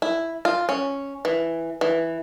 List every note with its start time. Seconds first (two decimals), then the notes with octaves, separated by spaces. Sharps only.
0.02 E4
0.45 F4
0.69 C#4
1.25 E3
1.81 E3